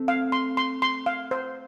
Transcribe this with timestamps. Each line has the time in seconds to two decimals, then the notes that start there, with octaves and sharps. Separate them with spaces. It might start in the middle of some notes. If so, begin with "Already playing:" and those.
Already playing: A3 C4
0.08 F5
0.32 C6
0.57 C6
0.82 C6
1.06 F5
1.31 C5